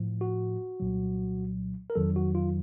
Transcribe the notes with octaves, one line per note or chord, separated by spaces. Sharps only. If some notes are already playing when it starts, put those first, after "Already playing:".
Already playing: A2 F3
F#4
C2 A#2 F#3
A#4
F2 D#3 F#3 A4
F#4
F4